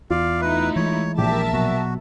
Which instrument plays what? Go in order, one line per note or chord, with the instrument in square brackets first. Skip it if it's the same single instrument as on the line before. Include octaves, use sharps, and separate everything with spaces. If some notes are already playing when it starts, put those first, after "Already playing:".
[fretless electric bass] E2 [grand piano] F4 [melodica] D5 F5
[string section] A3 D#4 E4 [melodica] B4
[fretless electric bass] E3 G#3 [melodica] C#5
[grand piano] A#1 A#2 [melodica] G4 [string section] A#4 E5 A5
[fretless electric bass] B2 F#3 [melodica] F#4